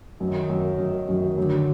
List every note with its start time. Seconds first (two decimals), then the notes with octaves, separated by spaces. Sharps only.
0.20 F#2 D#3
0.50 F#2
0.78 F#2
1.08 F#2
1.38 D3 F#3